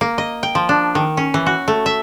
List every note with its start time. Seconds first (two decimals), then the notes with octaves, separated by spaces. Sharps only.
0.01 A#3
0.18 D#5
0.43 G5
0.55 F3
0.69 D4
0.95 D#3
1.17 C#4
1.34 E3
1.46 F#4
1.68 A3
1.86 E5